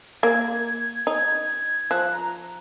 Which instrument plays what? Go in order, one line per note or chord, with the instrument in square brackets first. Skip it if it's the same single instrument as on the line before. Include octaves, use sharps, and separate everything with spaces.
[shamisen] A#3 [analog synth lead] G#6
[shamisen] D#4 [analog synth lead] G#6
[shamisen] F3 [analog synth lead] F#6
[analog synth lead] A#5